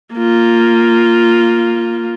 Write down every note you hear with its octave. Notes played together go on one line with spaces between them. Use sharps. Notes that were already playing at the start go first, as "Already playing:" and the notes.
A#3 F4